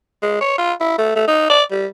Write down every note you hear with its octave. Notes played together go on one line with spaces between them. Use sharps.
G#3
C#5
F4
E4
A3
A3
D#4
D5
G3